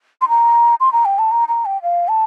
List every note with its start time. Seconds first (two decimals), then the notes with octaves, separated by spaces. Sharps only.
0.21 C6
0.29 A#5
0.80 C6
0.93 A#5
1.05 G5
1.19 A5
1.31 A#5
1.48 A#5
1.66 G5
1.82 F5
2.08 A5